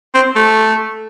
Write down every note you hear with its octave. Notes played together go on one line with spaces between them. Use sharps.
C4
A3